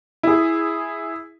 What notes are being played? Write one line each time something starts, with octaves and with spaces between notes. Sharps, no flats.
E4 G#4